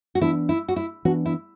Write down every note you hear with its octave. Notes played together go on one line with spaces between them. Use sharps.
F#4
E3 B3 D4 E4
E4
F#4
E4
E3 B3 D4 F#4
E4